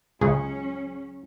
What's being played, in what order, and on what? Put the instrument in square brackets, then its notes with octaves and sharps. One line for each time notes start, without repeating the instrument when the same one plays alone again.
[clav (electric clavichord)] C#2 G#3 [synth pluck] C#3 G#4 [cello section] F#3 C#4